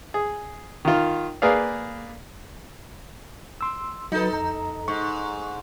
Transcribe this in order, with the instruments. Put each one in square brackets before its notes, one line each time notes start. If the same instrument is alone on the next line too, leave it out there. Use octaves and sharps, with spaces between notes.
[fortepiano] G#4
D#3 F4
A#3 G#4 B4 D5 F5
[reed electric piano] C6 E6
[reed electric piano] F#3 B4 [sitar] D#4 A4
[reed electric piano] F2 A#5
[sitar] G#2 [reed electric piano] C#6